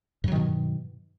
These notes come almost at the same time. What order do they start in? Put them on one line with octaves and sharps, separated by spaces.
G2 F#3 D#3 B2